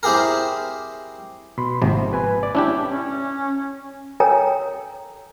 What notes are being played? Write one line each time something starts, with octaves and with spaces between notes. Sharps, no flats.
C4 E4 G4 G#4 A#4
B2 B5 C6
G#1 C3 F3 A#3 C5
B4 G#5 B5
D5
C#4 D4 E4 G4
C#4
A4 A#4 C#5 G5 G#5 A#5